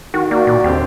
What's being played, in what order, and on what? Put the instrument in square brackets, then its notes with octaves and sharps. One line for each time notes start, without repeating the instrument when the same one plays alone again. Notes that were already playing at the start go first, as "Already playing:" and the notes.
[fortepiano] D#3 [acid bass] F#4
[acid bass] A#3 [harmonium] F#4 D5
[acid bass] A#2
[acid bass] D#2 [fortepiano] D3 C4 G4